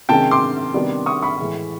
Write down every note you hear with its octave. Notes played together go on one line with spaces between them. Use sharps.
C3 D#3 G#3 C#4 G5 A5
C6 D6
C3 D#3 G3 B3 D4
C#6 D#6
B5 C#6
A2 E3 G#3